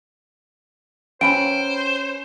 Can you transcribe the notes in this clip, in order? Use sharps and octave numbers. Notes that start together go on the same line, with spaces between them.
F#3 C#4 B4 C5 G5 D7